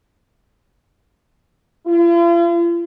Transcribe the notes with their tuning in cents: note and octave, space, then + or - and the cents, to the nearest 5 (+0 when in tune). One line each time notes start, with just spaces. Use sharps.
F4 -45